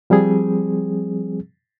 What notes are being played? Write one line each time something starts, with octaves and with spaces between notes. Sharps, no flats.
F3 G3 C4 G#4